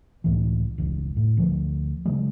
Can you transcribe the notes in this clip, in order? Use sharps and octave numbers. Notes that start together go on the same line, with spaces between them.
C#2 A2 E3
E1 C#2
A2
D2 F3
C#3 F#3 G#3